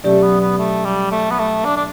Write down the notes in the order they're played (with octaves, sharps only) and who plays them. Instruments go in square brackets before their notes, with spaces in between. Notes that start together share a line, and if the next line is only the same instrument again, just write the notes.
[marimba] B2 F#3 C#4 G4 D5 [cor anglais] A3
[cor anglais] B3
B3
A3
G3
A3
B3
A3
D4
D4